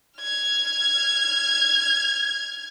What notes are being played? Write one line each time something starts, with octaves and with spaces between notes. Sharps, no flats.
F6 G#6